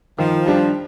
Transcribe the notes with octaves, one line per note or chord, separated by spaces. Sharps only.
D#3 F3
G3 D4 G4